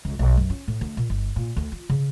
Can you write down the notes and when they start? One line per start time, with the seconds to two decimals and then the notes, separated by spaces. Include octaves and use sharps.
0.05 C#2
0.19 B1
0.37 F#2
0.50 C#4
0.68 A2
0.81 D2
0.97 A#2
1.10 G1
1.36 A#2
1.56 D2
1.72 F4
1.90 C#3